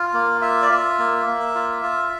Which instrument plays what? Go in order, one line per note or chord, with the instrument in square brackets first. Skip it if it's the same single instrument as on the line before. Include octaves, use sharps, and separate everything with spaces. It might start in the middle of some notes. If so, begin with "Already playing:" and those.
Already playing: [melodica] F4
A#3
F4 E5
D5
F4 E5
A#3
A#3
F4
F4